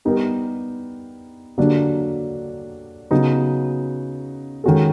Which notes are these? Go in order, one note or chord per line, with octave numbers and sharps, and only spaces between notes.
G3 B3 D#4 G4 A#4
D3 F#3 A#3 D4 G4
C#3 F#3 B3 D#4
D#3 G#3 C#4 F#4 A4